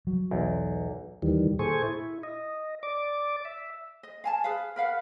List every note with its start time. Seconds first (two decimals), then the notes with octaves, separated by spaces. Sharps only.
0.07 F#3
0.31 B1 E2
1.22 D#2 D#3 E3 G3
1.59 A#2 G#4 A4 C5 G#5 C#6
1.83 E4
2.23 D#5
2.83 D5 D6
3.45 E5
4.03 D#5
4.24 F5 G#5 A5
4.44 G#4 B4 F5
4.76 A#4 B4 F5 F#5